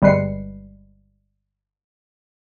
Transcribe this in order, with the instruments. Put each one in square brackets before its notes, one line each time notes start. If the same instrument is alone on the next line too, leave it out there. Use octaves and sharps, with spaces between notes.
[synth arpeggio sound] G1 G3 G#3 B4 C7 C#7